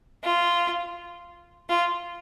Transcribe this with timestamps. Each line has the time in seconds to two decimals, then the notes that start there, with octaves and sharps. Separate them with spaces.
0.25 F4
1.69 F4